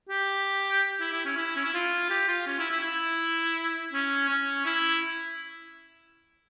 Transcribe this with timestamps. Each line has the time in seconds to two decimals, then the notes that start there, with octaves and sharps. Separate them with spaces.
0.09 G4
1.00 E4
1.12 E4
1.25 C#4
1.37 E4
1.56 C#4
1.64 E4
1.74 F4
2.10 G4
2.28 F4
2.47 C#4
2.59 E4
2.71 E4
2.83 E4
3.93 C#4
4.29 C#4
4.65 E4